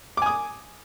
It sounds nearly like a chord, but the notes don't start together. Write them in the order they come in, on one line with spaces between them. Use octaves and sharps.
D6 G#5 D#6